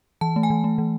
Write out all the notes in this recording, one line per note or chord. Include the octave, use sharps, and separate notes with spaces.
E3 A5
A3
G#5
E3
A3
E3